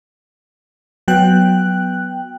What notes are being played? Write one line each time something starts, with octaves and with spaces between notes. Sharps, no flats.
F#3 B3 G5 F#6